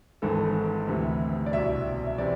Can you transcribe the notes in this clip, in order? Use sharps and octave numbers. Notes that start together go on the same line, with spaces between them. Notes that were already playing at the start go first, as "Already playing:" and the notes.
G#1 G#2 E3 A4
D2 C3 E3
D5
C2 B2 E5
E5
C3 E3 D5